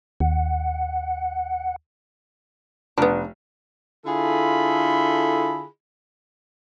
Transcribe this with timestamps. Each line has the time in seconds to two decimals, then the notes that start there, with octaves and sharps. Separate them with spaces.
0.20 D#2 F#5
2.98 F1 B3 D4
4.06 D3 E4 F4 G#4 A4 B5